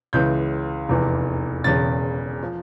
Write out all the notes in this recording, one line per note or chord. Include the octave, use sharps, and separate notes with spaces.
C#2 C#3 E3 G6
F1 E2 E3
E1 E2 C#3 A6
F3